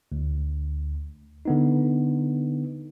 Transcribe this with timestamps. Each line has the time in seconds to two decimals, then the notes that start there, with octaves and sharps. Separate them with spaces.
0.12 D2
1.45 D3 B3 D#4